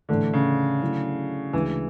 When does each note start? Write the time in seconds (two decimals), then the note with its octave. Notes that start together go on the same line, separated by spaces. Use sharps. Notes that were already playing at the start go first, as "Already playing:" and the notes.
0.09 A2 D3 E3 A3
0.33 C#3
0.81 C#3 F#3 A3 E4 G#4
1.53 D2 C#3 E3 G#3 D4 G#4